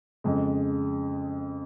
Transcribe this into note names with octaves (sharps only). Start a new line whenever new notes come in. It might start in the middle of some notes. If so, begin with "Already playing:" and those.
F2 C#3 G#3